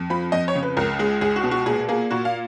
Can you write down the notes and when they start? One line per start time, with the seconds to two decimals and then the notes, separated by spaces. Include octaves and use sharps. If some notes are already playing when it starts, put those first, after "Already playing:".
Already playing: F2
0.10 F3 B5
0.32 F2 D#5
0.48 C#5
0.55 C#3
0.63 B4
0.77 C#2 A#4
0.99 G#3 G#4
1.21 C#2 G#4
1.36 F#4
1.43 B2
1.51 F#4
1.66 A#2 G#4
1.89 A#3 G#4
2.10 A#2 F#4
2.25 F5